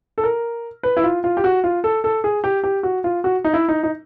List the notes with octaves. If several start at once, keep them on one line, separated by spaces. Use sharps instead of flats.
A4
A#4
B4
E4
F4
F4
G4
F#4
F4
A4
A4
G#4
G4
G4
F#4
F4
F#4
D#4
E4
D#4
D#4